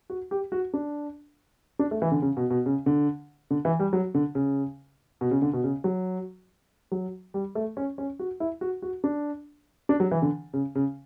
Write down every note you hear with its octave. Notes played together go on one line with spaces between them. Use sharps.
F#4
G4
F#4
D4
D4
A3
E3
D3
C#3
B2
B2
C#3
D3
D3
E3
G3
F#3
D3
C#3
B2
C#3
D3
B2
C#3
F#3
F#3
G3
A3
C#4
C#4
F#4
E4
F#4
F#4
D4
D4
F#3
E3
D3
C#3
C#3